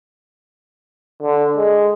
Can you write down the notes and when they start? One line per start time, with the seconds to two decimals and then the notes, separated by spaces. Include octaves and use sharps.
1.22 D3
1.57 G#3